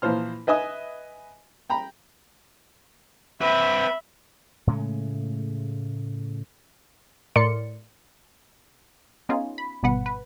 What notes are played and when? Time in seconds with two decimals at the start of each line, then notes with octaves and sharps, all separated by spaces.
0.02 A#2 E3 F3 C5 F6
0.47 B4 D#5 E5 G#5 D#6
1.70 G5 A#5 B5
3.41 C4 B4 E5 B5
4.67 A2 C#3 G#3 A3
7.36 A2 A#4 D5 C6 C#7
9.29 B3 C#4 D#4 F4 G#4
9.58 B5
9.83 G#1 G2 B2 B3 B4 F#5
10.06 B4